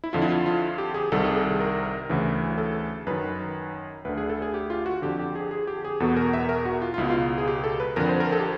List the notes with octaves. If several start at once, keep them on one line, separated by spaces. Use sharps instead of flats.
E4
F2 D3 F4
E4
F4
F4
G4
G#4
C2 C3 D#3 A4
G#4
A4
A#4
D2 C#3 E3
A4
F#2 D#3 B4
D2 D3 B4
G#4
A4
G#4
G4
F4
F#4
F2 D3 G4
G4
G#4
G#4
G4
G#4
E2 B2 A4
A#4
E5
A#4
F#4
F4
F4
C#2 B2 E4
F4
G#4
G4
A4
B4
F2 D3 A#4
C5
A#4
A4
G4